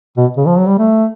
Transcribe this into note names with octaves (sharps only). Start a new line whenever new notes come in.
B2
C#3
F3
F#3
G3
A3